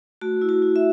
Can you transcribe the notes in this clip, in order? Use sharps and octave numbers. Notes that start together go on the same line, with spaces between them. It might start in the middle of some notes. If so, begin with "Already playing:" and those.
A3 F#4
E4
F#4
E4
E5